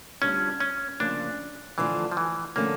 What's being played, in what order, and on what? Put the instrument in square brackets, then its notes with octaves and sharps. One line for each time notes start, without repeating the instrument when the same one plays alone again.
[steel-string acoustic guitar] D2 D3 G3 D4 F4 [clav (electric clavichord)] C#4
[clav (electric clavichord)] C#4
[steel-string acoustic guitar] D2 C#3 F3 A#3 C#4 [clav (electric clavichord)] D4
[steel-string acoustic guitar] D3 F3 A3 D4 F4 [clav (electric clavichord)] E3
[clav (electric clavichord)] F3
E3
[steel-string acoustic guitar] D3 F3 A3 C#4 [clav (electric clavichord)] A#3